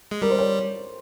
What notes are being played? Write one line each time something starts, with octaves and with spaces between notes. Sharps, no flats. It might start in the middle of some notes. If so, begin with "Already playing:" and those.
G#3
G3 A#4
C5
C#5